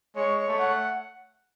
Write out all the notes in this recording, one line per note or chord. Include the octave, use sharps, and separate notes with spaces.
G#3 C#5
C#5
A3
F#5